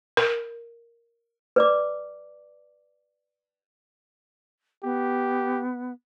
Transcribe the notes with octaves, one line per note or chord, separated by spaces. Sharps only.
A#4
B4 D5 D6
B3 G4